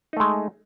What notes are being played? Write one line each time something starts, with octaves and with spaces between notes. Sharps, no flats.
G#3 A3 D#4